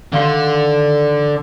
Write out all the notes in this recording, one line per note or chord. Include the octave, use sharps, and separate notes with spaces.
D3 D#3 F5 C6